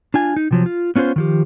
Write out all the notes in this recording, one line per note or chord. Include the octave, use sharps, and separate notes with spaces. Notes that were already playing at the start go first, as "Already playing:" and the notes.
D4 F4 G#5
D#4
C3 F3 F#3
F4
B3 C#4 F4 B4 C5
D#3 F3 G4